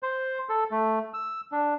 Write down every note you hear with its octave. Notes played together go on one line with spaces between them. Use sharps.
C5
A4
A3
E6
D4